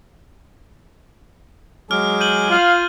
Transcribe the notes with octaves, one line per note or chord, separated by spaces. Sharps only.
F#3 G#3 G#4 D6 F6
G6 D#7 F#7
F4 F5